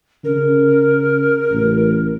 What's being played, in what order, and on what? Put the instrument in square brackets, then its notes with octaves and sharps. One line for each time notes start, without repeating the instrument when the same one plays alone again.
[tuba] C#3 [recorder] A#4
[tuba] A1